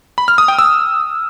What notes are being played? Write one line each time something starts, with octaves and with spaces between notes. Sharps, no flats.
B5
F6
D#6
G5
E6